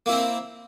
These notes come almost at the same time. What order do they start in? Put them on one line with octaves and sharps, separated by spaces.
A#3 E4 C4